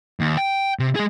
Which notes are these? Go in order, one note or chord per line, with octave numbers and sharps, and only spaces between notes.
D#2
G5
C3
G#3 G#4